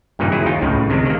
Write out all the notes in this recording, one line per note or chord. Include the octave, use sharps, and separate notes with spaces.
G2 A#2 C#3 E3 D#4
F#3 E4 G#4
D#2 D#4 F4 G5
C#2 A2 C#3
C3 D#3 G#3 D4
D#3 A#3